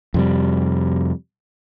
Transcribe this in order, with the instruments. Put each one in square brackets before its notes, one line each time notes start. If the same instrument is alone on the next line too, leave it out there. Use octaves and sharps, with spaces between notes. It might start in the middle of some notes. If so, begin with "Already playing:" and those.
[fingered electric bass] F2 C3 G3